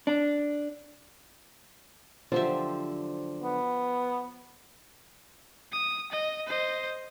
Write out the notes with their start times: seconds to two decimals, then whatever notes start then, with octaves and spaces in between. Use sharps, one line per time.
0.07 D4
2.32 D3 F3 F#3 G4 C5 E5
3.44 B3
5.72 D#6
6.12 D#5
6.47 C5 D#5